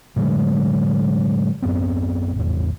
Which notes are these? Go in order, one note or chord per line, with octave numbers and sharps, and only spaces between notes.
A2 D3 F#3 G#3
F#2 B3 C4
G#1 E2